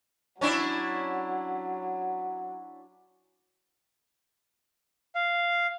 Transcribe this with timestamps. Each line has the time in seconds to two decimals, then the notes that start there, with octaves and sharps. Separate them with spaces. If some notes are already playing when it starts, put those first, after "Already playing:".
0.41 F#3 C#4 D4 E4
5.15 F5